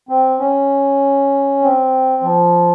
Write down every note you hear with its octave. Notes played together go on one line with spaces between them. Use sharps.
C4
C#4
C4
F3